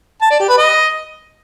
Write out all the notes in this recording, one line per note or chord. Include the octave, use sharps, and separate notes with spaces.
A5
D5
G4
B4
D#5